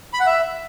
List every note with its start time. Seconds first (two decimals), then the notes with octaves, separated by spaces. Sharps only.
0.14 B5
0.20 F#5
0.26 E5